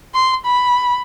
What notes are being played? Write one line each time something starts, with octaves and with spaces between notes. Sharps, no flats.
C6
B5